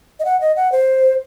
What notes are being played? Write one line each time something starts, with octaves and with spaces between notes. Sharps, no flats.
D#5
F#5
D#5
F#5
C5